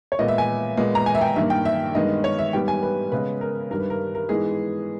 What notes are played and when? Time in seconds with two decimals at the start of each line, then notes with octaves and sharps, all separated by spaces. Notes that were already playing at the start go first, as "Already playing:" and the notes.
0.12 C#5
0.19 A#2 G#3 B3 D#5
0.28 E5
0.38 G#5
0.77 A#2 G#3 B3
0.95 A#5
1.06 G#5
1.15 E5
1.21 G5
1.36 G2 D#3 A#3 E5
1.50 G5
1.65 E5
1.95 G2 D#3 G#3 B3 D#5
2.24 C#5
2.39 E5
2.53 G#2 G3 B3 G5
2.68 G#5
2.83 B4
3.12 C#3 G#3 B3 B4
3.41 A#4
3.70 G2 D#3 G3 A#4
3.80 B4
3.90 A#4
4.15 A#4
4.29 G#2 E3 G#3 B3 G#4